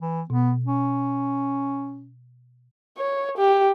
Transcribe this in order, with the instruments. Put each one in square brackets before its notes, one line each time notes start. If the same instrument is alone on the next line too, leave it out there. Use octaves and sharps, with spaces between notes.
[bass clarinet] E3
[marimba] B2 [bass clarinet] B3
[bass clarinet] C#4
[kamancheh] C#5
G4